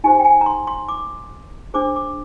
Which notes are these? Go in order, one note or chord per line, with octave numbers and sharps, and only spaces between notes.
D#4 G4 C5 G#5
G5
G#5
A#5
C6
C6
D6
D4 G#4 C5 D6
D6